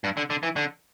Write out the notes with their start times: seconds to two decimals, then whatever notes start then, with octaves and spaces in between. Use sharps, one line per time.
0.04 G2
0.17 D3
0.30 D3
0.43 E3
0.56 D3